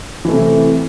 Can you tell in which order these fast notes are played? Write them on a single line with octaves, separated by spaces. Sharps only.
E3 A3 C3